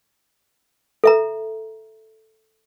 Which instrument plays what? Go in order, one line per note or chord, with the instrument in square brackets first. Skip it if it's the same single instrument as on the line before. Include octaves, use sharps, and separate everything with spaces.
[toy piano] A4 E5 A#5